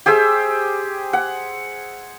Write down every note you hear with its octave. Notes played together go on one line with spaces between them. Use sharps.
G4 G#4 C5 E5
F#5